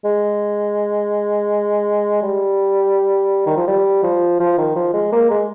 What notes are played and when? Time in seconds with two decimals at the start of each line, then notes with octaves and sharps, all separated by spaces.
0.05 G#3
2.22 G3
3.46 D#3
3.57 F3
3.67 G3
4.03 F3
4.40 F3
4.58 D#3
4.76 F3
4.94 G#3
5.12 A#3
5.30 G#3